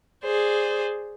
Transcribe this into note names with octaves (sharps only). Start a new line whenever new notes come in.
G#4 C5 D5